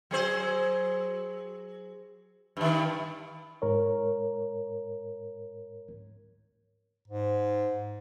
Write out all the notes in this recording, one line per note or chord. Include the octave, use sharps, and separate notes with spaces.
F#3 G#4 C5
G2 D#3
G#2 A#4 C#5
G#2